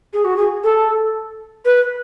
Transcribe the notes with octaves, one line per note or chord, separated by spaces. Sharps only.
G#4
F#4
G#4
A4
B4